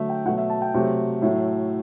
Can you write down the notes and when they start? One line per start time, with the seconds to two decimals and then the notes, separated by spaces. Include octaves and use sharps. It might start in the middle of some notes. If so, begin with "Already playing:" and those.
Already playing: D3 F#3 A3 E5
0.09 G5
0.25 B2 F#3 A3 F#5
0.38 E5
0.50 A5
0.62 G5
0.74 C3 F#3 A3
1.22 A2 F#3 A3 E5